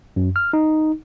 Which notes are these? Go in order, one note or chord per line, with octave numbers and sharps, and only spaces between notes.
F#2
F6
D#4